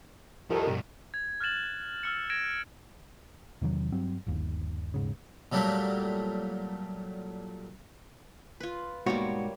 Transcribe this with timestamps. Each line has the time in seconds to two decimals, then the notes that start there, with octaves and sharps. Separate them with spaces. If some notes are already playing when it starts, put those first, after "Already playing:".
0.50 C2 D#3 F3 A4
0.67 G2 B2
1.14 G#6
1.40 F6 F#6 G#6 A6 E7 F#7
2.03 E6 F6 C#7
2.30 G#6 A#6 D7 E7
3.61 E2 C3 D#3 F#3
3.92 G2 F#3 C4
4.27 G1 D#2
4.94 D#1 G#2 C#3
5.52 A#2 F#3 G3 A3 A#3
8.60 F4 B4
9.06 G#2 B2 G3 A#3 F#4 C#5